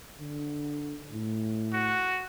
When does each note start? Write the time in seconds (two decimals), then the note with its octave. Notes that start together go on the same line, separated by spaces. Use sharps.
0.20 D3
1.11 A2
1.73 F#4